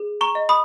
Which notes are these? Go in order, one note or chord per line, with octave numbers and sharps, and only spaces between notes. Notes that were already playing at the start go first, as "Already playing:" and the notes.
Already playing: G#4
A#5 C#6
D#5
B5 D#6